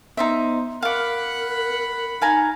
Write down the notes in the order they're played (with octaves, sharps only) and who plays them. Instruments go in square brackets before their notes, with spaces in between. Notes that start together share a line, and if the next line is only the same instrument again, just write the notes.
[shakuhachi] B3 [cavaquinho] D#4 C5 E5
[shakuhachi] A#4 [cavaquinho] F5 D6 [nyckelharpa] F#5 B5
[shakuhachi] D#4 [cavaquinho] F5 G#5 A#5